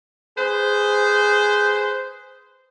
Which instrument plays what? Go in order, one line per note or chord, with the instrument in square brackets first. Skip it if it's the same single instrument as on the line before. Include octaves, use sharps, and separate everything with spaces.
[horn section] G#4 B4 C5